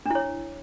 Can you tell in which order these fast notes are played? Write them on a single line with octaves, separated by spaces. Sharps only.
D4 E4 C#5